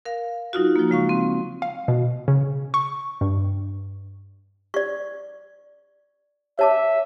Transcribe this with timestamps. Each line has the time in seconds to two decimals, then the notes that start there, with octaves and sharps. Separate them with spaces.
0.05 A#4 F5
0.53 F#3 D#4 F4 F#4
0.76 F3 A#3
0.90 C#3 G#3 F5 C#6
1.09 C4
1.62 F5
1.88 B2
2.28 C#3
2.74 C#6
3.21 G2
4.74 D5 C#6
6.59 C#5 E5 A5 D6